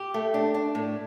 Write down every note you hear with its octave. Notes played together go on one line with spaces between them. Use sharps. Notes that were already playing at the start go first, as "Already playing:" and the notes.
Already playing: G4
A3
D4
D4
A2